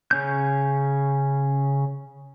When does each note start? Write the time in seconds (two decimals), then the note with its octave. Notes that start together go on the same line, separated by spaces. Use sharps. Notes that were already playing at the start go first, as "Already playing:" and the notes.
0.11 C#3 C#4 G6